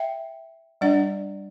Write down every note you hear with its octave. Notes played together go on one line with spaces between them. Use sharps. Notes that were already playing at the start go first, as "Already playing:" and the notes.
Already playing: E5 G5
G3 D4 D5 F#5